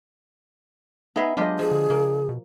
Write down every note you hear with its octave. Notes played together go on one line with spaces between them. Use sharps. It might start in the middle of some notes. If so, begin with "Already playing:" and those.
B3 D#4 G#4 B4 D#5 E5
F#3 G#3 D4 F4 G4 D#5
F3 G#4
D3
C#3 A#3
B2